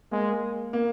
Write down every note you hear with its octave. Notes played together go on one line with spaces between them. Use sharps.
G#3 A#3
A#3